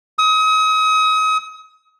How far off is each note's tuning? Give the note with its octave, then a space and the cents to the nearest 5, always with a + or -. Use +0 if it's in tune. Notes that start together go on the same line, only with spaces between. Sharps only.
D#6 +35